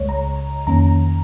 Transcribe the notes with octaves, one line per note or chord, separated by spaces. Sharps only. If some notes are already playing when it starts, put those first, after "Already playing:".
Already playing: C#2 C#3 G#3 C#5
A#5
F2 D#3 A#3 C#4 A#5